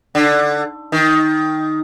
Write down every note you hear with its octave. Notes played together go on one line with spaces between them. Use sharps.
D3
D#3